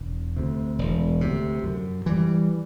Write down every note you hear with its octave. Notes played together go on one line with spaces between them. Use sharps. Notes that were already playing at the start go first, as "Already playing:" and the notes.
Already playing: E1
D2 C3
E1
D2 C3
F#2
E3 G3